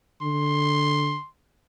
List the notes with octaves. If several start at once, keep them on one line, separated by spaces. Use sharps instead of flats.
D3 C6